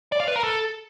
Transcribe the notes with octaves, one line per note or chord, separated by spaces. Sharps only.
D5
F5
B4
A#4
A4